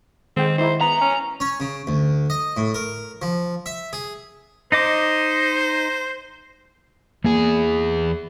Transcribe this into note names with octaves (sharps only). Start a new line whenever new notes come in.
D#3 G#3 C4 G5
D#4 E4 C5
B3 A#5
C#4 G#5
C#4
C#3
D2
D#5
A2
A#4
F3
E5
G#4
D#4 C5 D#5 D6
E2 A#3 G#4